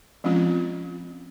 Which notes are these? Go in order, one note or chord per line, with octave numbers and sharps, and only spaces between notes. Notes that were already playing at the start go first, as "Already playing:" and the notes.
F3 G#3 C4 C#4 F4